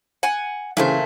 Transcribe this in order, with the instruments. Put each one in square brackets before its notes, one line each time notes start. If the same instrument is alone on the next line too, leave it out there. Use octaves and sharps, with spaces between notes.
[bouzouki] F#5 G#5
[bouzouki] A#2 A3 C5 [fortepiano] C#3 E3